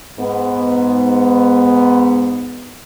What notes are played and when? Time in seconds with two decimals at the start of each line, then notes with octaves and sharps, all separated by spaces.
0.20 G#2 B3